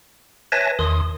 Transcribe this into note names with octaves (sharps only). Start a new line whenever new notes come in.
B4 C#5 E5 G#5 A5 A#6
E2 D#3 C6 D#6